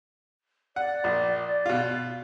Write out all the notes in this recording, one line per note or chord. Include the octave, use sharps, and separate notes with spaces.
D5 F#5
A#1
B2 F4